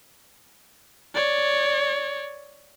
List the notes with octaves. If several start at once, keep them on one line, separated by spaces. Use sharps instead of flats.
C#5 D5